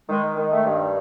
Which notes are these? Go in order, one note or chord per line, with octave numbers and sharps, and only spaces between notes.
D#3 G#3
D#3
A3
G2